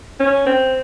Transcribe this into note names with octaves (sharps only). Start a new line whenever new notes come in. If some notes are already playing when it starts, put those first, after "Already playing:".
C#4
C4